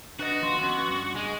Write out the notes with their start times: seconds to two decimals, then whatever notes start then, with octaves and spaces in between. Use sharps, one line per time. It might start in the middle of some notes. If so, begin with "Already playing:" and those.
0.19 D4 F#4 B4 D#5
0.42 D#2 F3 C6
0.59 B3 C#4 C6
0.88 G2
1.16 G#3